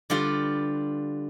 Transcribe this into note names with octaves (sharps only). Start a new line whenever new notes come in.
D3 G3 F4 G4 B4